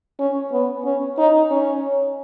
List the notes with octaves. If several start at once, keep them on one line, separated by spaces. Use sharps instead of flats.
C#4
B3
C#4
D#4
C#4